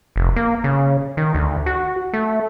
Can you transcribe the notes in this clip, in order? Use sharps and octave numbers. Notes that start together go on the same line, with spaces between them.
F1
A#3
C#3
D#3
D2
F#4
A3